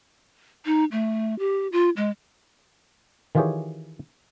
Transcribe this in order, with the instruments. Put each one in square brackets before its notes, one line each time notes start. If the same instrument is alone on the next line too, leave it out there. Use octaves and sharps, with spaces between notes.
[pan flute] D#4
A3
G4
F4
G#3
[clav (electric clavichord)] D#3 E3 F4 G4 G#4 C#5